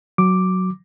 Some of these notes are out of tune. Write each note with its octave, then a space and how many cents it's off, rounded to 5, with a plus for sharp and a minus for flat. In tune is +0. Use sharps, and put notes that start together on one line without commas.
F#3 +0 D6 +0